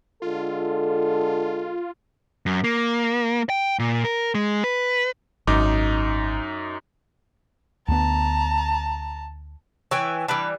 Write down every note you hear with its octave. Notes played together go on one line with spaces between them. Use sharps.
D3 G#3 F4 A4
F#2
A#3
G5
A#2
A#4
G#3
B4
G#1 F#2 D#4 D6
D2 B3 A5 A#5
E3 C#5 G5 G#5
E3 G3 D4 B4